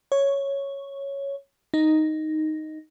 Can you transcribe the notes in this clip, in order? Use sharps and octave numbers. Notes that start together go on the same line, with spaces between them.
C#5
D#4